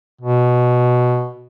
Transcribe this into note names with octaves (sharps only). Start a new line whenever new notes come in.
B2